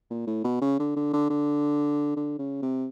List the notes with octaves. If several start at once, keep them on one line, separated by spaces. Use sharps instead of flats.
A#2
A2
B2
C#3
D3
D3
D3
D3
D3
C#3
C3